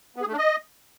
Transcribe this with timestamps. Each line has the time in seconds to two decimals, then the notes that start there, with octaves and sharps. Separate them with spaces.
0.16 B3
0.22 G#4
0.27 A3
0.33 D4
0.38 D#5